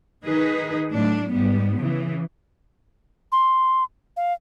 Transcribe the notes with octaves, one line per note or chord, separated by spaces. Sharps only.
D#3 D#4 G#4 B4
A2 F#3 D4
G#2 G3 B3
C#3 E3
C6
F5